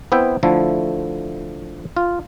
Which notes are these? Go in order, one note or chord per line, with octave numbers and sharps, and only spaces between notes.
B3 C4 E4 E5 G5
D3 F3 A3 E4
F4